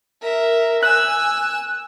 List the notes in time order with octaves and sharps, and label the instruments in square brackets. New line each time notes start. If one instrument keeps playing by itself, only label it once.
[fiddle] A#4 E5
[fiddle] G#5 E6 [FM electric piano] F#6